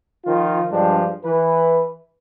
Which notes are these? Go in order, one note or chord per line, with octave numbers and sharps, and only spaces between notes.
D#3 F3 F4
G2 F3 G3 G#3 D4
E3 B4